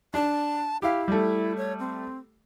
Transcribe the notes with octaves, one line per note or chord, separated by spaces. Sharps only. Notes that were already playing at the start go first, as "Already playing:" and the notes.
D4 A5
E4 G4 F5
G3 A3
C#5
C4